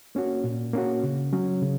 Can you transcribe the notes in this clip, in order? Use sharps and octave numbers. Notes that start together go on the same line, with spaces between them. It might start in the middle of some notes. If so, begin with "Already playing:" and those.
A#3 C#4 F#4
A#2
A#3 C#4 F#4
C#3
F#3 C#4
C#3